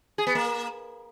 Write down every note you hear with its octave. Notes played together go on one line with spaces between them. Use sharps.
G#4
B3
A#3